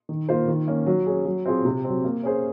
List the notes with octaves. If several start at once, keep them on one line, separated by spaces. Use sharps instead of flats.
D#3
A#3 F4 C5
D#3
A#3 C#4
F#3
C#4 G#4
F#3
C4 F4 G#4
C3
F#3 C4
A#3
C#4 G#4 C5